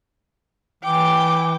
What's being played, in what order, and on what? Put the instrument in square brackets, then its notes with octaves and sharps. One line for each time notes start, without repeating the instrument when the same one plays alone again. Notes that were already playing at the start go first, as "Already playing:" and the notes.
[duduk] E3 [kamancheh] G5 D6